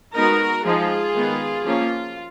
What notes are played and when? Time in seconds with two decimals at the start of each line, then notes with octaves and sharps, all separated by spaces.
0.15 G#3 B3 D#4 F#4 A#4
0.65 F3 G#3 D#4 F4 G#4
1.15 D#3 G#3 B3
1.65 F3 A#3 C#4 F4